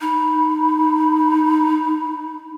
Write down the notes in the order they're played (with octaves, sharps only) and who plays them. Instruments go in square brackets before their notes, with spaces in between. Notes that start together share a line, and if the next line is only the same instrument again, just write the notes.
[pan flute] D#4 [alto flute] B5